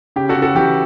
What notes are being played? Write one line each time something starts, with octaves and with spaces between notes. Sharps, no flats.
C#3 G4
F#4 A4
C#3
F#4 A4
E3 G4